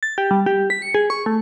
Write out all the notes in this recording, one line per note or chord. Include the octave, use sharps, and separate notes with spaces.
A6
G4
G3
G4
B6
C#7
G#4
C#6
A3